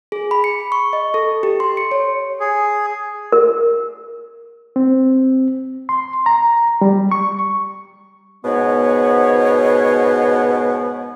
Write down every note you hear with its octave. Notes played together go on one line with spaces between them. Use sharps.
G#4
B5
C#7
C#6
D#5
A4
G4
C6
C#7
C#5
G#4
A#4
C4
C6
A#5
G3
C#6
G#2 B2 B3 C#5